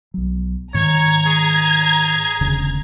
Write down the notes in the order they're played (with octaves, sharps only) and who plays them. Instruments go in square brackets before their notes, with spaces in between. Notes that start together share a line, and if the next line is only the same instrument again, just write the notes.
[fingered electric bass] B1 F#3
[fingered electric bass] G#2 D#3 [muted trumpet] C#5 [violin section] A#5 G#6
[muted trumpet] G#4
[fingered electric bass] E1 D2 C#3